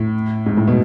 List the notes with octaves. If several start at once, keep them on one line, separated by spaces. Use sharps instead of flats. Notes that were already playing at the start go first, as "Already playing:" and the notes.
Already playing: A2
G#2
A2
B2